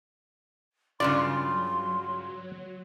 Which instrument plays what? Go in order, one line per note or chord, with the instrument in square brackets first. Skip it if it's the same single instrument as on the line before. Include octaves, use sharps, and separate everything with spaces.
[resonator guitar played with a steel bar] G2 C#3 F4 [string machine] F#3 [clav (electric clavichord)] D5 [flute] C6